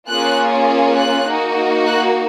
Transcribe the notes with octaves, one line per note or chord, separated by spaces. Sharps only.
A#3 C#4 F4 G#4 F#6
F#6
A#3 D#4 F#4
F#6